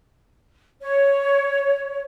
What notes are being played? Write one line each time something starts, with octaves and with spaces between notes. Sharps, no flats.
C#5